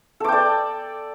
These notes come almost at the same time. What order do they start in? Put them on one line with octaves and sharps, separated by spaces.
A4 D6 G5 D5